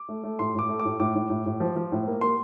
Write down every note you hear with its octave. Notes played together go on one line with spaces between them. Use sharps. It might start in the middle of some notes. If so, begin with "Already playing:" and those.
Already playing: D6
A3
A3
A2 C6
A2 D6
A3
D6
A2
A2 D6
A2
A2
A2
F3
F3
A2
A#3
A#3 C6